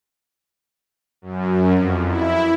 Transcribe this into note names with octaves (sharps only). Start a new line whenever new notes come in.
F#2
F2
E4